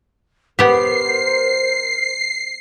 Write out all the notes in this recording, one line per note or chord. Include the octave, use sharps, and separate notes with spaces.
B3 G4 A#4 C5 C7